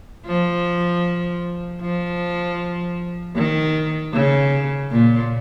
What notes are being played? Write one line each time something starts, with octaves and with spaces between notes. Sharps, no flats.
F3
F3
D#3
C#3
A#2